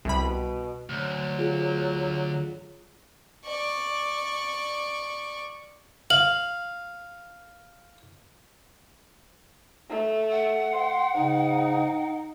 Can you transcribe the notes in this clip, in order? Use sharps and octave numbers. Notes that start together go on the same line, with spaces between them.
C2 B2 B5
D2 F#3
F4 G#4
D5 C#6
F5 F#7
A3
F#5
C6
G#2 C#3 D#4